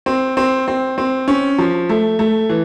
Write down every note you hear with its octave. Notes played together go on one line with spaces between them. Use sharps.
C4
C4
C4
C4
C#4
F3
A3
A3
E3